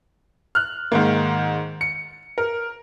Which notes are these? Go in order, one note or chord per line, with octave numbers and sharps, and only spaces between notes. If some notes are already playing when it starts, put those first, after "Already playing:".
F6 F#6
G#2 D#3 A#3
C#7
A#4